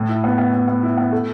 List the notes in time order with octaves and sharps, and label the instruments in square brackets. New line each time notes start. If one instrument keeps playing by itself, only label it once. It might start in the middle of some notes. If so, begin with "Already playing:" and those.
Already playing: [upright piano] A2
E4
B3
B3
B3
B3
E4
B3
A3